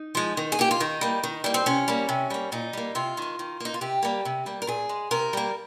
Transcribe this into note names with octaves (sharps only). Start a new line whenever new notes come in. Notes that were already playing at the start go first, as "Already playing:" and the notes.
Already playing: D#4
F3 G#3
D#3
G#4
A#3 G4
F4
D#3 D#4
G3 A#3
D#3
G3 A#3
C4
C3 C#4
G3 A#3
C3
G3 A#3
A#2 D#4
G3 A#3
C3 F4
D#3 G#3
D#3
A#3 D#4
F4
C3 G4
G3 A#3
C3
G3 A#3
A#4
A#2 G#4
G#3
C3 A#4
G3 A#3